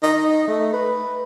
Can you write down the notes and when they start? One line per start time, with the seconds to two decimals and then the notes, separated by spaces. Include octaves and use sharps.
0.03 D#4
0.48 A3
0.73 B4